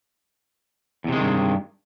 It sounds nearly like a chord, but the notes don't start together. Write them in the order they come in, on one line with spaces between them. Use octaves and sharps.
E2 C3 G#3 D#3 G2